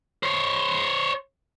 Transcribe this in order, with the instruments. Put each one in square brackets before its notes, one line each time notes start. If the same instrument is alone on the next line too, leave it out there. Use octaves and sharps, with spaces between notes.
[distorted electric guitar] C5 C#5